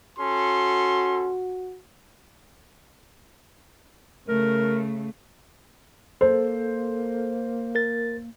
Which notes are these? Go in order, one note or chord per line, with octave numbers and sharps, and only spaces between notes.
C#4 F#4 A4 C6
C#3 A3 A#4
A#3 A4 C5
A#4 A6